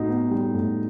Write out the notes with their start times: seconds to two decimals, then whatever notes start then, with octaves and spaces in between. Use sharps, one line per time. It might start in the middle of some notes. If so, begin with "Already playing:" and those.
Already playing: A2 C4 D#4 F#4
0.09 B3
0.31 G3
0.54 A2